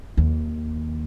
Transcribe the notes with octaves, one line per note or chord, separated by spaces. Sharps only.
D#2